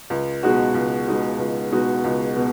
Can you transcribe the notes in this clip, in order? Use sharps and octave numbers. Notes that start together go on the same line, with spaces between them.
C#2
B2 G#3 D#4 F#4
C#2
B2 G#3 D#4 F#4
C#2
B2 G#3 D#4 F#4
C#2
B2